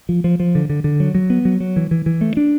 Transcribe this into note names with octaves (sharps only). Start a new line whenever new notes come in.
F3
F3
F3
D3
D3
D3
F#3
F#3
B3
F#3
F#3
E3
E3
E3
A3
D4